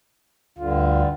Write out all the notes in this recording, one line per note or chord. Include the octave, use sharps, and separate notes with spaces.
D2 G2 D3 F4